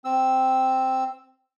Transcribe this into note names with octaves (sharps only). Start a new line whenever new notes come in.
C4 E6